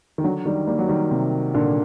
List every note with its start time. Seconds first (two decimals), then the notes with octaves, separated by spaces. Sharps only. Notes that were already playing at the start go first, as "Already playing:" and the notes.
0.18 D#3
0.24 D3 F#3
0.46 D#3 G3
0.67 G3 A#3
0.79 F#3
0.89 D#3 G3
1.11 C3
1.55 A#2 D3